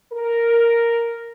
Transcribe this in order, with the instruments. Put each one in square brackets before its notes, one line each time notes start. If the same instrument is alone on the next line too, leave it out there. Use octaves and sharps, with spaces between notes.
[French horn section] A#4